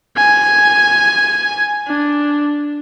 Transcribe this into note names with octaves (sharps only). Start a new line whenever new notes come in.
G#5
D4